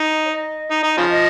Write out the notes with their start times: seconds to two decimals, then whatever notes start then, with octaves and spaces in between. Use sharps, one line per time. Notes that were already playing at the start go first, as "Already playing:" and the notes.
Already playing: D#4
0.25 C#5
0.32 D#5
0.71 D#4
0.83 D#4
0.97 C#3 F3
1.10 D#5